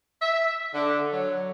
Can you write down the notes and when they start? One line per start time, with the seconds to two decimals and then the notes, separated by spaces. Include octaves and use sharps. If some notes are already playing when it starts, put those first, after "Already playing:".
0.22 E5
0.73 D3
1.13 F#3